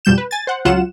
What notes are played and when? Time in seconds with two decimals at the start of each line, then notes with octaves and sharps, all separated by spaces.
0.05 F2 B2 G3 G6 E7
0.18 B4
0.31 G#5 A6
0.47 C5 F#5
0.65 C#2 C#3 F#3 F4 F#5 E7